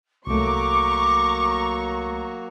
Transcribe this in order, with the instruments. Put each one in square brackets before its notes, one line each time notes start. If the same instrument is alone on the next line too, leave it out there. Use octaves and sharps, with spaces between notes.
[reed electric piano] C2 A3 [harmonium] F#3 A#3 F#4 [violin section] A#5 C#6 [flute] D6